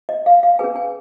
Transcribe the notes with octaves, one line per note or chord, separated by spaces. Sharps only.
D#5
F5
F5
C#4 G#4 B4 G#5
G#5